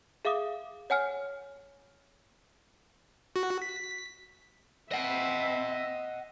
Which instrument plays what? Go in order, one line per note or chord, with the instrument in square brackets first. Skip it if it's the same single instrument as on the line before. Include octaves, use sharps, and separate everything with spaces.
[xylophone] G#4 E5 F5 D6 D#6
C#5 F#5 G#5 F6 C7
[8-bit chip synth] F#4
B6
[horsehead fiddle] C4 E5 [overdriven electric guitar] D#5 F#5